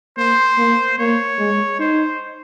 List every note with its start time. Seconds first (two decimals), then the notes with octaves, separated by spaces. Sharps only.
0.17 A#3 C5
0.58 A#3
0.98 A#3 C#5
1.39 G#3
1.79 D#4 C5